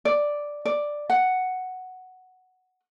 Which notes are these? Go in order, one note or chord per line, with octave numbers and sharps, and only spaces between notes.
D5
D5
F#5